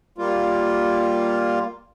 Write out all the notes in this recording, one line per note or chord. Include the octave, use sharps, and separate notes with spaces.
G3 A#3 F4